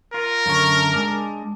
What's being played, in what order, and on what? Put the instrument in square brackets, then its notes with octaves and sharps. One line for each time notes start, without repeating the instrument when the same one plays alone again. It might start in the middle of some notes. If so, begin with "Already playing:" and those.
[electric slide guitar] F4 [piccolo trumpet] A#4
[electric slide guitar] F#2 D3 C#5
G#3 D4